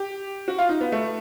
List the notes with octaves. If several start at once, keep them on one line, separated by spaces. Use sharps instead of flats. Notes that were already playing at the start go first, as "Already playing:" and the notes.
Already playing: G4
F#4
F4
D#4
B3
A3